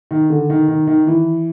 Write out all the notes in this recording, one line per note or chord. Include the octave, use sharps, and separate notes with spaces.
D#3
D3
D#3
D#3
D#3
E3